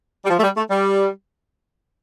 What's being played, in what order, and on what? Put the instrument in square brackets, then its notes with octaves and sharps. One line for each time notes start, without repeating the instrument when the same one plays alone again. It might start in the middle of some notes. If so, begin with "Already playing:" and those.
[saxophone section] G3
F3
A3
G3
A3
G3